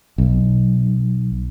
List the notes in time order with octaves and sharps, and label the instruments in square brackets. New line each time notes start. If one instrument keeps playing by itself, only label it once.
[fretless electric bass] B1